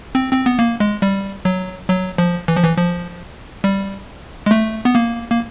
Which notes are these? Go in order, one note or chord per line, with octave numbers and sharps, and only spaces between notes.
C4
C4
B3
A#3
G#3
G3
F#3
F#3
F3
E3
F3
E3
F3
G3
G#3
A3
B3
A#3
A#3